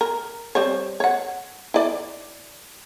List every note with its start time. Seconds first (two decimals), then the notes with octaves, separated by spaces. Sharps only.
0.01 A#4
0.55 G3 C4 C#5
1.00 C#5 F#5
1.74 E4 D5